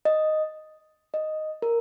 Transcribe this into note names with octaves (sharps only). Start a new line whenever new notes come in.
D#5
D#5
A#4